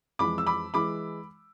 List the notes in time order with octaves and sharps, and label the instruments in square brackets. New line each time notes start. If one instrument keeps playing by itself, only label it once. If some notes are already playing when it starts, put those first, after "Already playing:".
[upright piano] F2 E3 G#3 B5 D6
E6
B5 D6
E3 G#3 B5 D6